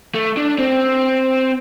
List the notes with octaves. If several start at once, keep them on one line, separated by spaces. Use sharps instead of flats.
A3
D4
C4